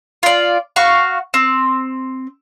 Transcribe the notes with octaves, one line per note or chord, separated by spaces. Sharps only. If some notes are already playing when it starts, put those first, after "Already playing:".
F4 D5
F#4 F5 C#6
C4